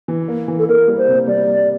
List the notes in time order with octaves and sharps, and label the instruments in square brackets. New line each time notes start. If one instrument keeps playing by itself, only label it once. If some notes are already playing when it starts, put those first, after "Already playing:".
[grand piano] E3
A#3
E3
[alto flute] A4
[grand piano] A#3 [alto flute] A#4
[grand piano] G3
[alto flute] C5
[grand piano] C3
[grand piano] G3 [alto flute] D5
[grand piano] G3